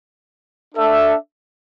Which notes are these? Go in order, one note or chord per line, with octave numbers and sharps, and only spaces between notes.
D4 A4 E5